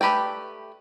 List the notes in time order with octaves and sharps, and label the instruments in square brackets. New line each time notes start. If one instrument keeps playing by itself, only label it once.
[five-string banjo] A3 G4 B4 D5 G5